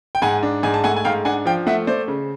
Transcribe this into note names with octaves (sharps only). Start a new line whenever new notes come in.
G5
G#2 F#5 G#5
D4
G#2 G#5
A5
A3 F#5 G#5
G#5
G#2 F5 G5
D4 F#5 G#5
F3 F5 G5
A3 E5 F#5
A3 C5 D5
C#3